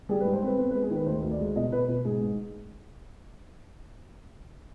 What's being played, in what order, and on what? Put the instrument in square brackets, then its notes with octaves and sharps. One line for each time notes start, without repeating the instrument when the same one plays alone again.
[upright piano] G3 G#4
B4
G#2
C5
C4 B4
B3 B4
B4
G#3
G#4
D#3
B4
D2 C5
D2
D5
G#3
B2 D#5
B2 B4
B2 B4
G#2 G#4
G#2